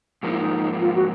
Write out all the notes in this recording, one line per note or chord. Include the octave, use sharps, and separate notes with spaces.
G#2 F3 A#3 D#4
E4
D#4
F4
F#4